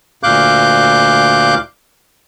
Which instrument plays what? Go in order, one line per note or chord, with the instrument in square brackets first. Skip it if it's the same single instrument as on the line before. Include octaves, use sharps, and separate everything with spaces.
[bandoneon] D2 A#2 F5 D6 F#6 G6